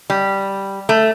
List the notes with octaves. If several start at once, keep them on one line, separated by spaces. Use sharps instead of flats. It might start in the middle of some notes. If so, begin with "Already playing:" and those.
G3
A3